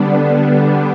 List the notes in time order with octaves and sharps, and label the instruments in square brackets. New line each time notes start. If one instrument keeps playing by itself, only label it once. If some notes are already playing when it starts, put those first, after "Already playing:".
Already playing: [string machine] D3 G3 B3 D4